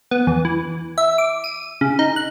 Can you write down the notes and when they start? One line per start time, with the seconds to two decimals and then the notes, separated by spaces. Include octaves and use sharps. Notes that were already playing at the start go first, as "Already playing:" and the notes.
0.11 B3
0.27 E2
0.45 E3
0.98 E5
1.18 D6
1.44 D#7
1.81 C#3
1.99 D#4
2.16 F#6